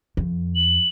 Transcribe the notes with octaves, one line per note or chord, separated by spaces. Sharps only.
F2
F#7